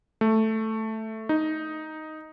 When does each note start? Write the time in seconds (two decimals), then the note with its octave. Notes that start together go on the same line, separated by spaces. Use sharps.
0.21 A3
1.29 D#4